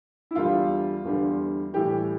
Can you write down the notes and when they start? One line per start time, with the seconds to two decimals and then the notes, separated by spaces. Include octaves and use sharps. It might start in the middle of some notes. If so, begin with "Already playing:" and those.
0.31 E4
0.35 E2 D3 G3 F4
1.05 E2 D3 G3
1.73 A2 E3 G3 G4